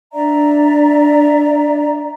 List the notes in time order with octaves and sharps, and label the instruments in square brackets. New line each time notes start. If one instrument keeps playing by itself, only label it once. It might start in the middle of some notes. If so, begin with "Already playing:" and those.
[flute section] D4 D5 E5 A#5